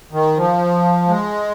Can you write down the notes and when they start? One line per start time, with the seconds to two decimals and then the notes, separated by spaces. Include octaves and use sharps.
0.13 D#3
0.37 F3
1.08 G#3